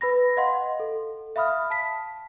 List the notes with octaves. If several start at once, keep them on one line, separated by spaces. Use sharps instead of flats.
B4 B5 A#6
D#5 F5 F#5 C6
A4
E5 F5 B5 D#6 F6
A5 B6